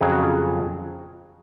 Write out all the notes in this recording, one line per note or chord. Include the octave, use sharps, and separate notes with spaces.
F2 C#3 F#3 G#4
F#4
F4 G#4